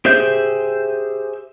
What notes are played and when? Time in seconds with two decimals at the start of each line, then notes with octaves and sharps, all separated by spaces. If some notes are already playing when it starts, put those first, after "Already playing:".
0.05 G4 G#4 C5 E5 G6